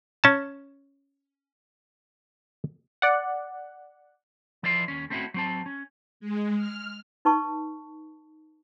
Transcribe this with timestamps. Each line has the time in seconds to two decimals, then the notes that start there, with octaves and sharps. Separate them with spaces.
0.24 C#4 A5
3.02 D5 F#5
4.63 F3 E4 B4 D5 E5 C6
4.88 D#2 C#4
5.10 A3 C4 C#4 D#4 E4 F#4
5.34 F#3 C4 A5
5.66 C#4
6.20 G#3
6.57 F6
7.25 D#4 B4 A5 C#6